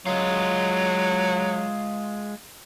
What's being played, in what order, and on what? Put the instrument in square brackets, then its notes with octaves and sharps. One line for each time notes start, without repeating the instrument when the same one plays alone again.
[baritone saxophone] F#3 [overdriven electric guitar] G#3 F4